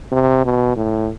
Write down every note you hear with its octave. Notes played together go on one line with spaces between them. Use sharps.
C3
B2
A2